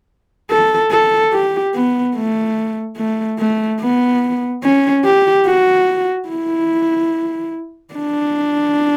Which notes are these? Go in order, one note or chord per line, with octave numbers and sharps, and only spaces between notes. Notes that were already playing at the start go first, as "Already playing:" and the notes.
A4
A4
G4
B3
A3
A3
A3
B3
C#4
G4
F#4
E4
D4